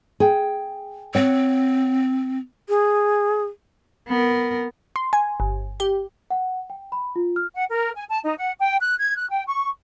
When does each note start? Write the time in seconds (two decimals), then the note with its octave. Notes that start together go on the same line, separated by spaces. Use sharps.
0.20 G#4 G5
1.15 C4 C#5 F#5
2.69 G#4
4.08 B3 A#4
4.96 C6
5.13 G#5
5.40 G1
5.80 G4
6.31 F#5
6.70 G5
6.92 B5
7.16 F4
7.36 F6
7.55 F#5
7.70 A#4
7.94 G#5
8.08 A5
8.23 D#4
8.38 F#5
8.59 G5
8.81 F#6
8.99 G#6
9.16 F#6
9.30 G5
9.47 C#6